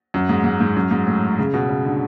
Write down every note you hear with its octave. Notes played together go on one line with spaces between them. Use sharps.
F#2
G#2
G#2
G#2
F#2
G#2
A2
C#3
B2
C#3
D3